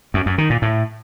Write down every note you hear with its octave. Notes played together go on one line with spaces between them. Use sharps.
F#2
F#2
D#3
A#2
A2